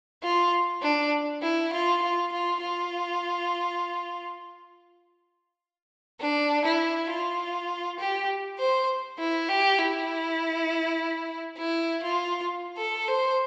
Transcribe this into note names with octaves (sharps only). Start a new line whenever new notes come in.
F4
D4
E4
F4
F4
F4
F4
D4
E4
F4
G4
C5
E4
G4
E4
E4
F4
A4
C5